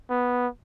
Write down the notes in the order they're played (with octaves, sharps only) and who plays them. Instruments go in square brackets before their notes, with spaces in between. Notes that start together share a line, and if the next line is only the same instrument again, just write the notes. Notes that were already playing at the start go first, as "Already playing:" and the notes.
[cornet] B3